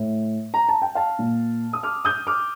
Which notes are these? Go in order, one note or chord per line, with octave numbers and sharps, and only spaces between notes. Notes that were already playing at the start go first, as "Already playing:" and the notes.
Already playing: A2
A#5
A5
G5
F5 A5
A#2
D#6
D6 F6
D#6 G6
D6 F6